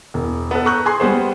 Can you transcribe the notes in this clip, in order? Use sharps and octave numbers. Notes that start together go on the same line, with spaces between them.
E1
B3 A4 B4
A#5 C#6 F#6 G6
G#4 G#5 C6
G3 G#3 B3 C5